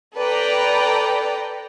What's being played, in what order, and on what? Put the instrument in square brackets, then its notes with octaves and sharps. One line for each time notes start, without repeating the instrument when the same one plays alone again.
[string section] A4 B4 D5 G5 A#5